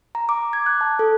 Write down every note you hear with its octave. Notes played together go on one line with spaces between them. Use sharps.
A#5
D6
G#6
F#6
A5
A4